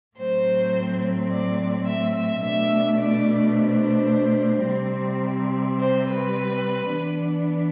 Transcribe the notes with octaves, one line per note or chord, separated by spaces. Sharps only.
A2 F#3 A3 C4 C5
D5
E5
E5
B2 A3 D4 E5
D5
C5
C3 G3 C4
C5
B4
E3 B3 D4